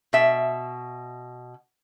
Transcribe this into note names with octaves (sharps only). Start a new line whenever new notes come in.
B2 E5